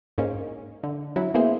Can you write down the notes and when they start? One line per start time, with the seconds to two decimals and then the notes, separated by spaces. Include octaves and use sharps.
0.18 G#2 A#3 C#4
0.83 D3
1.16 F#3 C#4 E4
1.34 A#3 B3 E4 G#4 C5